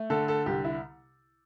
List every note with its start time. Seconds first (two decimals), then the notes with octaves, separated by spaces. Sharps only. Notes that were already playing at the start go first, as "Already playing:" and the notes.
Already playing: A3
0.10 D3 A4
0.28 A4
0.46 C2 G4
0.64 E4